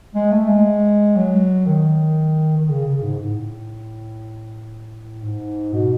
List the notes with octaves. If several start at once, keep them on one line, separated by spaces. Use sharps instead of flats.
G#3
A3
G#3
F#3
D#3
D#3
C#3
C#3
G#2
A2
G#2
B2